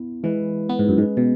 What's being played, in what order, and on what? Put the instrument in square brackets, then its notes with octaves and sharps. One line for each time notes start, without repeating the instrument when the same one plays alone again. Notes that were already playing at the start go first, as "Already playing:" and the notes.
Already playing: [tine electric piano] B3 E4
[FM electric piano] E3 [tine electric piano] G#3 E4 B4
[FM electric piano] B3
G#2
F#2
[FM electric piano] G#2 [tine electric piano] G#3 C#4 G#4 B4
[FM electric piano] B2